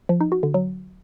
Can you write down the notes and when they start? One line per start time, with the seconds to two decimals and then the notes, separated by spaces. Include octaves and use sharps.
0.09 F3
0.21 D#4
0.32 F#4
0.43 D3
0.54 F#3